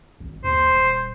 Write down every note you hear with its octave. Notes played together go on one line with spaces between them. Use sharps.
G#1
D#2 C5
D#1